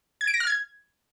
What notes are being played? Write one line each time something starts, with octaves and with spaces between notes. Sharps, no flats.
G#6
D7
A#6
F6
G#6